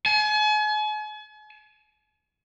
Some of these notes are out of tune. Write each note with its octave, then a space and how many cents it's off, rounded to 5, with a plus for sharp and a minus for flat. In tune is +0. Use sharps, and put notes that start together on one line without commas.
G#5 +40